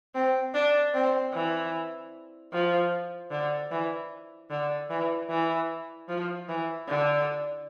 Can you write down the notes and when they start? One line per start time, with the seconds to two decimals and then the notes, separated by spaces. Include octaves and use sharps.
0.15 C4
0.54 D4
0.94 C4
1.33 E3
2.52 F3
3.31 D3
3.71 E3
4.50 D3
4.90 E3
5.30 E3
6.09 F3
6.48 E3
6.88 D3